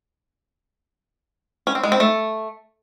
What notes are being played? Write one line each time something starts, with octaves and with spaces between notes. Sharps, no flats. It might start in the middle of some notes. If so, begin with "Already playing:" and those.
C#4
C4
G#3
C4
A3